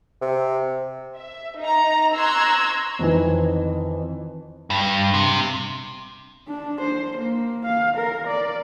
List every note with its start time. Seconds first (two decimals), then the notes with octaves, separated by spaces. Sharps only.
0.22 C3
1.16 E5
1.59 D#4 A#5
2.15 A#5 C6 C#6 E6 F#6 G#6
2.99 F2 D#3 E3
4.70 G2
5.14 C3
6.48 D4
6.81 C5
7.18 A#3
7.65 F5
7.97 A#4
8.28 D5